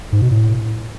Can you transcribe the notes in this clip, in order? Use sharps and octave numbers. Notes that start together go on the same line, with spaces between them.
G#2
B2
A2